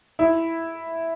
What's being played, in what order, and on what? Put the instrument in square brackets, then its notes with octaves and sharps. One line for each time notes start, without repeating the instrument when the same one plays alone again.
[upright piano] E4